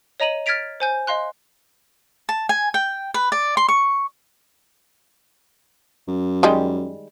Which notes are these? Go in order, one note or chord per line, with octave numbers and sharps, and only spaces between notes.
C#5 D#5 A#5 D#7 F#7
F6 G#6 A6 B6 D7 F7
C5 G#5 G6
D#5 F5 C6 F#6
A5
G#5
G5
B4
D5
C6
C#6
F#2
D#3 G3 G#3